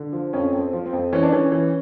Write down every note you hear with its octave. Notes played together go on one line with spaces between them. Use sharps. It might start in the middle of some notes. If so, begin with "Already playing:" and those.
Already playing: D3
F3
F2 C#4
F2
C4
F3
C4
F2
E3 C#4
D4
E3 C#4
E3